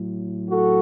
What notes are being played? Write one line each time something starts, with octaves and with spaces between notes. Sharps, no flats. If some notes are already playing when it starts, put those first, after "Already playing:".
Already playing: A2 F#3
F#4 A4